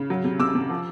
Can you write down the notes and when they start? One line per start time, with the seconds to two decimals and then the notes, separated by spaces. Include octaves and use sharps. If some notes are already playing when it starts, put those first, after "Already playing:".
Already playing: C#3
0.10 F#3
0.24 C3
0.39 C3 D6 E6
0.55 C3
0.70 F3